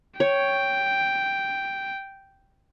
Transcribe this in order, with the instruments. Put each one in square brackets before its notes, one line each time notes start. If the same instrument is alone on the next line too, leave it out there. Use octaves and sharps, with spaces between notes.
[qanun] C#5 [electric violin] G5